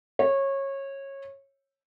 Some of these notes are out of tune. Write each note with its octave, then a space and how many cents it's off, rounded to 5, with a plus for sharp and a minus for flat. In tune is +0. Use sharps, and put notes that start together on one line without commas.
C#5 -20